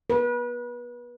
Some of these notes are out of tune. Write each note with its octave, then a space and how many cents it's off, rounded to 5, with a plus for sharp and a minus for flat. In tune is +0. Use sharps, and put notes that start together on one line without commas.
B4 -30